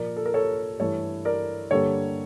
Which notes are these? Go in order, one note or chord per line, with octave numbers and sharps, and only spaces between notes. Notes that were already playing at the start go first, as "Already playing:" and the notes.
Already playing: A#2 F3 A#3 A#4 D5
A4
A#4
A4 C#5
G2 E3 A3 A4 C#5
A#4 D5
G2 D3 G3 A#3 A4 C#5